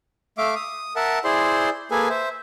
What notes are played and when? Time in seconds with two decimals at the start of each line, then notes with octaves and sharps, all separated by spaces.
0.38 A3 E5 F5 D6
0.55 D#6
0.96 A#4 E5 F#5 A5
1.24 E4 G#4 C5 D5 C6
1.91 A#3 G#4 A4 B4 G#5
2.09 C5 E5